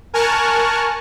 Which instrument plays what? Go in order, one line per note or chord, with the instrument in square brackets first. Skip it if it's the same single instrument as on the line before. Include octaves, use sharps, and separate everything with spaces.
[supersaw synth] A#4 G#5 A5 C#6 F6 F#6